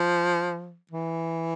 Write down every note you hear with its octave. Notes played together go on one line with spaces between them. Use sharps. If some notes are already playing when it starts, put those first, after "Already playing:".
Already playing: F3
E3